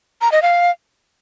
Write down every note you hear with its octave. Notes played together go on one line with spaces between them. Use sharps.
A#5
D#5
F5